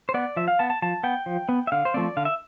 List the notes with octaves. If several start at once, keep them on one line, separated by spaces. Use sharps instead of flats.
C5
B3 D5
F3 E5
F5
B3 A5
A5
F3 A5
B3 G5
F3
B3
E5
D3 F5
C5
F3 A3 C4 D5
D3 F5
E5